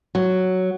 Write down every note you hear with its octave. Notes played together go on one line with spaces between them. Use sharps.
F#3